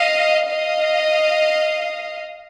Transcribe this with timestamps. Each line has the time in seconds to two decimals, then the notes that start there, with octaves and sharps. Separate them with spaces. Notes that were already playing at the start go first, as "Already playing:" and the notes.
Already playing: D#5 F5
0.47 D#5 F5